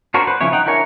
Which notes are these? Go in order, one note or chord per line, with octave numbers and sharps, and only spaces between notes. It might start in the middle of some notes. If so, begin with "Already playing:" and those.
D4 F#4 A#4 C5 C#5
B4 C5
C#3 F3 C#4 E4 C#5
D#4 F#5 G5
D4 E4 A#4 C#5 G#5